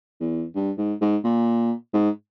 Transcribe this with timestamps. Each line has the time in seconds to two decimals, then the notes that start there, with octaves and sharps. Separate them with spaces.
0.20 E2
0.55 G2
0.78 G#2
1.01 G#2
1.24 A#2
1.93 G#2